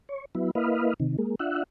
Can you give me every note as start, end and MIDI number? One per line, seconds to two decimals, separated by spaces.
0.09 0.25 73
0.35 0.51 54
0.35 0.51 59
0.35 0.51 64
0.55 0.94 58
0.55 0.94 64
0.55 0.94 71
0.55 0.94 75
0.55 0.94 77
1.00 1.17 48
1.00 1.17 51
1.19 1.35 56
1.19 1.35 58
1.39 1.63 62
1.39 1.63 65
1.39 1.63 76
1.39 1.63 78